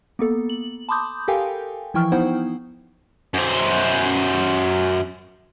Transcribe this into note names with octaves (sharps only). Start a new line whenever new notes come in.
A#3 B3 A4
F#7
A5 B5 C6 D6 D#6 G6
G4 A4 A#4 F5 G5 G#5
E3 F3 E4 G5 C#6 F6
B3 D#4 E4 C5 F#5 G5
F#2 C5